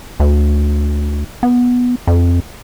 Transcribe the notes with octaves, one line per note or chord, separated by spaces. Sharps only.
D2
B3
F2